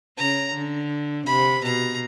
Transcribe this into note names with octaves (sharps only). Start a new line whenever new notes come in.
C#3 A#5
D3
C3 B5
B2 A#5